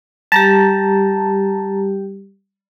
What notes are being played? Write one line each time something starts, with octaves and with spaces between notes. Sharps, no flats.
G3 G4 A5 A#5